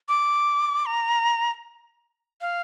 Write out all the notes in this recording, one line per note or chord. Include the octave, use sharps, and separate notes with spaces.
D6
A#5
F5